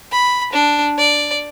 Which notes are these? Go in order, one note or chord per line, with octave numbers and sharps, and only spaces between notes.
B5
D4
D5